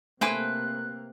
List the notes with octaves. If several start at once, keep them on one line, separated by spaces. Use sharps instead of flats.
C3 A3 A#3 B4 C5 G5 G#5 F#6